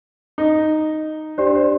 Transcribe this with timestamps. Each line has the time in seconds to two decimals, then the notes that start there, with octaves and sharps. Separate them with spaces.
0.38 D#4
1.38 D4 G4 C5 D5
1.55 C5